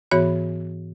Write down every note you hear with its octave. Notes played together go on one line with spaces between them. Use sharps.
G#2 E3 B3 F#4 C#5 B5